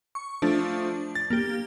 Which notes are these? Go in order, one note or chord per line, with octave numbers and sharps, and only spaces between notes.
C#6
F3 A3 D4
A6
A#3 G4